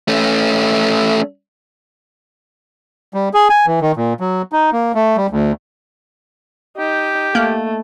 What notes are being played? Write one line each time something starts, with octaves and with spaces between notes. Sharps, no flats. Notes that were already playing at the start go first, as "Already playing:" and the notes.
A3 C#4
G3
G#4
G#5
E3
D#3
A#2
F#3
D#4
A#3
A3
G3
D2
D#4 G4
A3 A#3